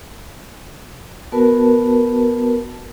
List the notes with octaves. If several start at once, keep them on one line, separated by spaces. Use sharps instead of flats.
B3 F#4 A#4 B4 A5